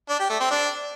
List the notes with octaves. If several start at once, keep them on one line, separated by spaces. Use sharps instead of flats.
D4
G4
A3
C4
D4